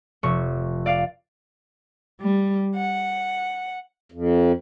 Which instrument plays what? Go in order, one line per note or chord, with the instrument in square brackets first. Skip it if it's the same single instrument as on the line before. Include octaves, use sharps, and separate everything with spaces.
[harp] F1 C#6
D5 F5
[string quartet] G3
F#5
[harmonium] F2